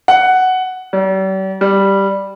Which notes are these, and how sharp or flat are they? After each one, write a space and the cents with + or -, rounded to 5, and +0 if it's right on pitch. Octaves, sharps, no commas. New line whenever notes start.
F#5 +5
G3 -45
G3 +0